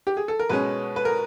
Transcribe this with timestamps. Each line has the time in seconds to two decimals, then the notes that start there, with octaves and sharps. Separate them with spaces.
0.07 G4
0.17 G#4
0.28 A4
0.40 A#4
0.49 B2 G#3 C#4 B4
0.96 B4
1.05 A#4